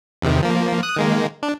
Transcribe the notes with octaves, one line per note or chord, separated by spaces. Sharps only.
E2 C3 D#3
F3 A#3
D#6 F#6
D#3 G#3 A#3
D4